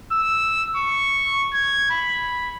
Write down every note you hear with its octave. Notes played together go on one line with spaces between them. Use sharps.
E6
C#6
G#6
B5